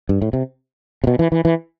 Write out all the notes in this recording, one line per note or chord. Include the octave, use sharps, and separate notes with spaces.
G2
A2
C3
C3
B2
E3
E3
E3